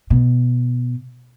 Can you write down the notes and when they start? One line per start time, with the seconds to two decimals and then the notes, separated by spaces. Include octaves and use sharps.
0.10 B2